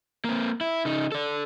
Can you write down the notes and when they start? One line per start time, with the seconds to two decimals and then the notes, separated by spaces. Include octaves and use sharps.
0.25 A#3 C4
0.61 E4
0.85 C#3 D#4
1.12 A4 D5